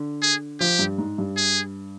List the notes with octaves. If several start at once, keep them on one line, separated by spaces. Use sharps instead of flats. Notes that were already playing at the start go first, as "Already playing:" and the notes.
Already playing: D3
G#4
F3 G4
G2
G#2
G2
G#4